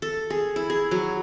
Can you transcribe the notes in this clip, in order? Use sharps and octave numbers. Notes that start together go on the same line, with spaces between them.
A4
G#4
E4
G#4
F#3